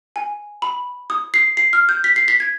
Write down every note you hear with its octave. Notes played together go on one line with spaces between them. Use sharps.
G#5
B5
D#6
C7
C7
F6
G6
B6
C7
B6
G#6